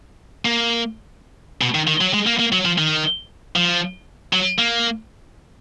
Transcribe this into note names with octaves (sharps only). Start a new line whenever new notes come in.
A#3
B2
D#3
D#3
F#3
G#3
A#3
A#3
F#3
F3
D#3
F3
F#3
A#3